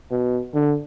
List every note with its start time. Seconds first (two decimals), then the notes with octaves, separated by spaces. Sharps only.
0.11 B2
0.54 D3